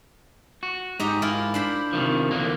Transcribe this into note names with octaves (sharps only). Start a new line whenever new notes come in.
F#4
G#2 D#4 G4 A#5
E4 F4 A#4
D4 C5 B5
C3 D#3 F3
E2 D3 A#3